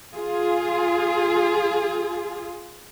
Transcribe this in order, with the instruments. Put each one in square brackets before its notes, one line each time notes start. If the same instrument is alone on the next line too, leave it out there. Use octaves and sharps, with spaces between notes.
[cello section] F4 G#4